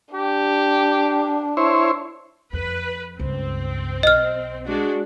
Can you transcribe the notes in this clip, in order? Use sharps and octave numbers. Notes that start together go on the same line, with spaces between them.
D4 G4
E4 C5 C#5
F2 B4
C#2 G2 C4
B1 D#5 F6
G#3 D4 F#4